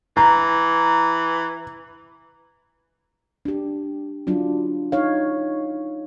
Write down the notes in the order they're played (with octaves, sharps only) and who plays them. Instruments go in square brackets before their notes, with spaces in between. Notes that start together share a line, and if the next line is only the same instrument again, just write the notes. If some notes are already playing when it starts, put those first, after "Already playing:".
[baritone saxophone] E3 [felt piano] A#5
[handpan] D4 G4
F#3 D4 E4 F4
D#4 C#5 F5